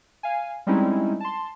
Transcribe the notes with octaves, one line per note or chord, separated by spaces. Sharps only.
F5 G#5
G3 G#3 C4 C#4 D#4 E4
A5 C6